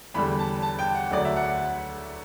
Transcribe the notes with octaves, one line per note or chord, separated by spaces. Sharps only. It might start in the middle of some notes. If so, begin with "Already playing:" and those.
E2 D3 G3 B5
A5
A5
G5
F#5
D2 D3 F#3 A3 D5
E5
F#5